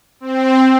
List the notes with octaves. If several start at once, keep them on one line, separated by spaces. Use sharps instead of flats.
C4